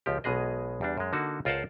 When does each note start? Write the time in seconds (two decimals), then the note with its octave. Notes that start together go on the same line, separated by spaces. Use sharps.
0.06 C#2 F3 G4
0.24 B1 B2 G#3 G#4 D#5
0.81 E2 G3 D4
0.97 F#2 G#3
1.13 D3 A#3 D#4 F#4 A5
1.45 C#2 F4 A#4 C5 F#5 A5